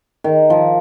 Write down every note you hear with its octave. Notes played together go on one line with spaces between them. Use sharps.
D#3
F3